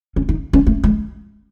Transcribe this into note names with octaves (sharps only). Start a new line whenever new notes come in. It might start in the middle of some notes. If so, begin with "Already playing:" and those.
C#4
D#4
C#4
A3
G#3